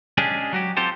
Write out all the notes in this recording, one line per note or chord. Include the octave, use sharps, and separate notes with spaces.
G#3 C#4 D4 G4 G#4
F#3 F#4 G4
C4 F4 G4 A4 C5